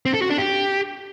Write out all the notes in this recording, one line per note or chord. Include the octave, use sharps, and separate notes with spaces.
C4
A4
F#4
D4
G4